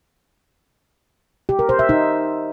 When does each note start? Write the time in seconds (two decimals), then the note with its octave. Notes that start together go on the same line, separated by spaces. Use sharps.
1.49 G4
1.59 A#4
1.69 C5
1.79 E5
1.89 D#4